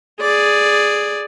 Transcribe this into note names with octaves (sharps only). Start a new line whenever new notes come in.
G#4 D5